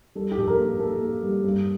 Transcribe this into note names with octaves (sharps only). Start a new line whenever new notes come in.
G3 A4
G4
A#1 A4
A#4
A#3
A#3 A4
A#3
G3
G2